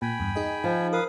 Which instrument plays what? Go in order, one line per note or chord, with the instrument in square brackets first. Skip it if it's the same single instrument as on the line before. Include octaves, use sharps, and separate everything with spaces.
[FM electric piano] A#2 [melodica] G5 G#5 B5
[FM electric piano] E2 G2
D#4 G#4 D#5
[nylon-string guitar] F3
[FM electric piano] A#4 [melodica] B4 F5 D#6